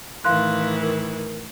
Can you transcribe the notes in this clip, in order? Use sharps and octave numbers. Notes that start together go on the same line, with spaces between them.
A2 D#3 E3 F5 C6 F#6
A#4